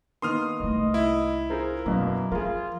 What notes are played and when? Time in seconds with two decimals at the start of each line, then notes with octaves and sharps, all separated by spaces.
0.22 D#3 A#3 B3 C6 D#6 F6
0.60 C2 A3 D#5
0.94 E4
1.50 F4 G#4 A#4 C5
1.86 F#2 B2 F#3 A#3
2.32 F3 F4 G#4 A#4